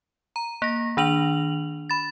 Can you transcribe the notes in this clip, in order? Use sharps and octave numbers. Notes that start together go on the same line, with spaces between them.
A#5
A#3 A#6
D#3 D4 F7 F#7
B5 A6